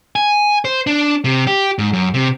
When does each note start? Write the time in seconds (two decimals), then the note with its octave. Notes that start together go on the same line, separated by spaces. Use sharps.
0.16 G#5
0.65 C5
0.87 D4
1.24 C3
1.47 G4
1.79 G#2
1.93 F#2
2.14 C3